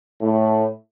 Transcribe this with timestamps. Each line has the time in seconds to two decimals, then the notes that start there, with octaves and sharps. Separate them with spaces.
0.21 A2